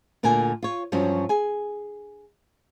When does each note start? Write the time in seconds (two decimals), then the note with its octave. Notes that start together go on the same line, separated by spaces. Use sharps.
0.23 D2 A#2 D3 A#4 G#5
0.62 F4 C#5
0.92 G2 F3 F#3 C#4 F#4
1.29 G#4 G#5